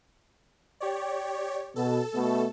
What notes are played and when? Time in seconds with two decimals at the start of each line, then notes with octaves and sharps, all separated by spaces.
0.80 G4 C#5 D5
1.76 B2 A4 A5
2.15 B2 A3